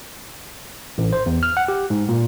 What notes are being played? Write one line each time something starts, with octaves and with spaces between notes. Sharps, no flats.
A1
C5
E2
F6
F#5
G4
G#2
A#2